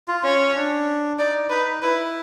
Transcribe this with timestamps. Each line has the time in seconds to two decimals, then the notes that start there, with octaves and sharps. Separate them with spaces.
0.08 F4
0.24 C#4 C#5
0.56 D4
1.18 D#4 D5
1.50 D#4 B4
1.82 E4 B4